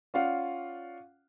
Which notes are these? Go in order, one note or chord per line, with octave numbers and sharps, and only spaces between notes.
C#4 F4 D5 F5 F#5